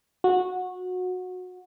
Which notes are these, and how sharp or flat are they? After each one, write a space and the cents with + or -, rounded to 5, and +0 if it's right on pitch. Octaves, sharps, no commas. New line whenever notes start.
F#4 -20